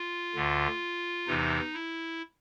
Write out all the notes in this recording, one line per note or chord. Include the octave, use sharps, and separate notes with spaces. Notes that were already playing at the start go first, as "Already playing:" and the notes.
Already playing: F4
D2 D3
E2 C3 E3 D#4
E4